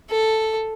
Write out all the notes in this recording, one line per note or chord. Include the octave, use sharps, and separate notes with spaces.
A4